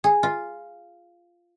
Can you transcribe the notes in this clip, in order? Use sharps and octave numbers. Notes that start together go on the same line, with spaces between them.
G#4
F4